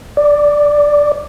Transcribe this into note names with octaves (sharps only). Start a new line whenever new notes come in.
D5